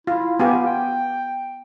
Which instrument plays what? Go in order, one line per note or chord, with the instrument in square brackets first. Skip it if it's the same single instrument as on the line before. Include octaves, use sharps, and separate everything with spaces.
[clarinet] E4 [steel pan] F4
[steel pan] B3 F4 G4 [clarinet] G#5
[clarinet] G5